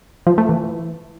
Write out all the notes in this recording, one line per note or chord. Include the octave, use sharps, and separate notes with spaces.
F3
A3
E3